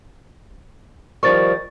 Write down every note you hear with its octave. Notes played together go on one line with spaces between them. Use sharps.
D#3 F3 G3 C#6 A6